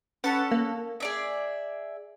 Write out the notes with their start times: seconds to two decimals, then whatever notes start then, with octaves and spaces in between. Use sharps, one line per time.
0.24 C#4 A4 B4 F#5 A6
0.52 A#3
1.00 G#4 D5 E5